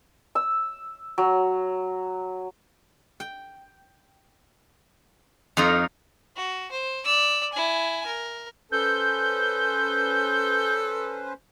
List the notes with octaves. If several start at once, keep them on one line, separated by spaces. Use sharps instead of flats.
E6
F#3
G5
F2 D#4 F4 A#5
F#4
C5
D5 E6
E4 G#5
A#4
C#4 A4 B4 C5 G6